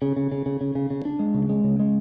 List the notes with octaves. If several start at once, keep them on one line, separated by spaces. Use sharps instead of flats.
C#3
C#3
C#3
C#3
C#3
C#3
C#3
D4
G#3
C#3
G#3
C#3
G#3